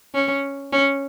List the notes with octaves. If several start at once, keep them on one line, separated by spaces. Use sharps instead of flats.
C#4
C#4